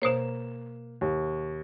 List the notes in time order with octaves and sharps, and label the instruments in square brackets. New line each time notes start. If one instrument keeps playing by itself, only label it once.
[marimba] B2 C5 C#5 [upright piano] A#3 E7
[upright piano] D#2